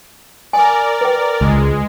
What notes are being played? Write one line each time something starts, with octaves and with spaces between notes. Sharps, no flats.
A#4 D5 G#5
B4 G5
C#2 G#3